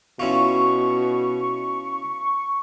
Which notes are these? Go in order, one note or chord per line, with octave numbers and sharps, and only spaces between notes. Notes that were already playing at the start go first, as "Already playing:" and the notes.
B2 C#4 E4 F4 C#6